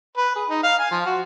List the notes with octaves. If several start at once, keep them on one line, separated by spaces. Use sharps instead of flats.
B4
G#4
D#4
F5
G#5
F3
F#4